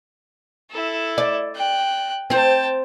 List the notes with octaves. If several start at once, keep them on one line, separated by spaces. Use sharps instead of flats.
E4 A4
D5
G5 F#6
C4 C5 G5 A5